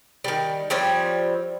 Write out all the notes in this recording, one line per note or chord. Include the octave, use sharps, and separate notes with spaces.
D#3 G3
F3 G3 C4 C#5